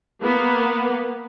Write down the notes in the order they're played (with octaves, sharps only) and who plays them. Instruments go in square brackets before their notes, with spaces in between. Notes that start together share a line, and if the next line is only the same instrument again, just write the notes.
[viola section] A#3 B3